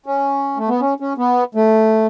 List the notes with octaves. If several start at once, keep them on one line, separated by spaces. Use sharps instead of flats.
C#4
A3
B3
C#4
C#4
B3
A3